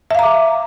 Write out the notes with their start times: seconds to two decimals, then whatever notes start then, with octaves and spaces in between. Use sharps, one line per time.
0.11 E5
0.15 F5
0.19 A#5
0.23 D6